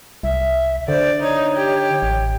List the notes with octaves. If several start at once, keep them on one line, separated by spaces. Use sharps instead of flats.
C2 E5
D3 C5 D5
D#4 C#5
G4
A1